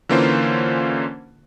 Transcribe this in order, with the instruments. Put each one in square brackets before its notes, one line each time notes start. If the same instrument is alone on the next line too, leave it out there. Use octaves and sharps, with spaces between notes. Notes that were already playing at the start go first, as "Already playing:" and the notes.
[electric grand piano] D3 E3 A#3 C#4 F4 C5